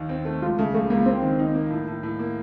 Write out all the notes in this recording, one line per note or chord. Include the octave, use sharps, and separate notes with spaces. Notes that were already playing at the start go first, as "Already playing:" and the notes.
Already playing: D#2 D#3
C4
A3
C#2 F4
C#3 A3
C#2 A3
C#2 A#3
A#3 C4
D#3
D#4
A#3
A2
A2
A2
A#3